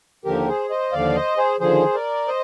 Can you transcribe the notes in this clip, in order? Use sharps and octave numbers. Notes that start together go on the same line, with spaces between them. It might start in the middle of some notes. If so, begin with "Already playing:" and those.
D#2 D3 F3 G4 A#4
G#4 C5
C5 D#5
D#2 D3 F3 D5 F5
C5 D#5
G#4 C5
D#2 D3 F3 G#4 C5
A#4 D5
C5 D#5